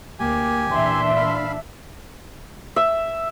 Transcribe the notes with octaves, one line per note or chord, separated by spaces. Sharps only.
D2 A#3 G4 G#5
A#2 E3 D4 E5 C6
F5 B5
E5